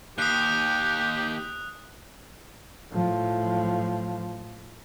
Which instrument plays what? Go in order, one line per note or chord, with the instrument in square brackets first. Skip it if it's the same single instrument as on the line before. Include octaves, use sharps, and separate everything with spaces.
[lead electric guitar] D#2 [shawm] G4 [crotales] D#6 F#6
[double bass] A2 F3